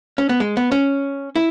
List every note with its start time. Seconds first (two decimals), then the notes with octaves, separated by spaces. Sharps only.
0.18 C#4
0.29 B3
0.40 G#3
0.57 B3
0.72 C#4
1.36 E4